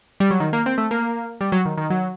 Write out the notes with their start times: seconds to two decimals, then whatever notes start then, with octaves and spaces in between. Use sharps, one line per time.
0.20 G3
0.31 F#3
0.40 D#3
0.53 A#3
0.66 C4
0.78 A3
0.91 A#3
1.41 G3
1.52 F#3
1.65 D#3
1.77 D#3
1.90 F#3